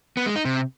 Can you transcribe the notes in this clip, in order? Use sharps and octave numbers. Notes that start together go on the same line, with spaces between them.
B3
G#3
D#4
C3